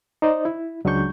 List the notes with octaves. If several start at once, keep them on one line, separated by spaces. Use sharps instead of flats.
D#4 C5 D5 D#5
E4
C#2 F#3 G#3 D4 C#6 G6